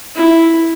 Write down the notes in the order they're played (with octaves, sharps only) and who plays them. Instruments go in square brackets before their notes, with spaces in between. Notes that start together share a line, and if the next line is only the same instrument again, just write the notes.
[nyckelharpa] E4